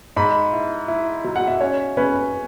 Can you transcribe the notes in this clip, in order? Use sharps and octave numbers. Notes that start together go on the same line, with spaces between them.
G#2 B5
E4
E4
F#3
F#5
E5
C#4 C#5
C#4 B4